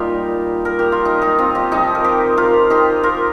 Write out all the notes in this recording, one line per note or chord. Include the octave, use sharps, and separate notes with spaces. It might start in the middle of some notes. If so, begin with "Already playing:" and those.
Already playing: A#2 G3 D#4 F4 G4 A#4
A#4
G4
F4
D#4
D#4 G4
C4 F4
D#4 G4
C3 F3 D#4 G4
A#4
G4 C5
F4 A#4
D#4 G4
F4 A#4